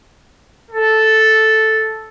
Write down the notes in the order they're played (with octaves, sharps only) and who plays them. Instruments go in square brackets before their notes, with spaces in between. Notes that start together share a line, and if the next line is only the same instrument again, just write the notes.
[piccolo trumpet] A4